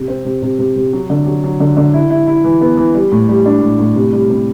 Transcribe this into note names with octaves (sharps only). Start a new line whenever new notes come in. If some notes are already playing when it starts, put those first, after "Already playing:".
Already playing: C3
C4
C3
C3
C3
C3
F#3
D3
F#3
F#3
D3
D3
E4
E4
E4
E3
B3
E3
G3
A2
G3
D4
A2
A2
C3
G3
C3